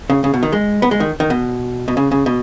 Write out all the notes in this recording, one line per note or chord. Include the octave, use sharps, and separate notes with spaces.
C#3
C#3
B2
D#3
G#3
B3
G#3
D#3
D#3
B2
B2
C#3
C#3
B2